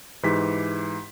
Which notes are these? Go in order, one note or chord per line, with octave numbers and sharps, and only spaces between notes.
G#2 E3 G4 B6